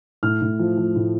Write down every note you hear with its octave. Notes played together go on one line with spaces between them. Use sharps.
A2 F6
A2
F3
F3
A2